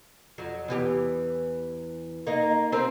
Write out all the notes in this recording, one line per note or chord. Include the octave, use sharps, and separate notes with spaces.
F2 F#3
E2 E3 G4
A#3 D#4
C4 G4 A#4